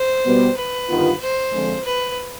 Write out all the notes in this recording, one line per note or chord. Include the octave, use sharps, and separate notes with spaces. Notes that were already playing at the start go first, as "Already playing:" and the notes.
Already playing: C5
B2 G3 B3
B4
G1 G2 D#3 B3 F4
C5
F2 D3 F3 G#3
B4